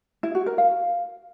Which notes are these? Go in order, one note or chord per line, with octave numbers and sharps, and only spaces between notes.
E4
F#4
A#4
F5